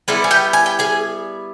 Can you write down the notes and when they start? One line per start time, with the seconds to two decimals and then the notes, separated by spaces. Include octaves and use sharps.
0.08 G3 G#3 B3 E4 G#4
0.24 G#5
0.31 G4 G5
0.53 G#5
0.66 G5
0.79 G#4 G#5